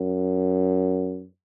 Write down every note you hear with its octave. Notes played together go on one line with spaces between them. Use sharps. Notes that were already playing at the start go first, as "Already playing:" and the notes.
Already playing: F#2